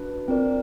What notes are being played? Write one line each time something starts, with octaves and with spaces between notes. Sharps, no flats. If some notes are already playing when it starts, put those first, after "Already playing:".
Already playing: D4 F#4 B4
C4 F4 A#4 D5